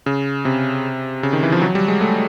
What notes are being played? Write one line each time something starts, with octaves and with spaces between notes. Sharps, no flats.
C#3
C3
C#3
D#3
E3
F3
F#3
G3
G#3
A3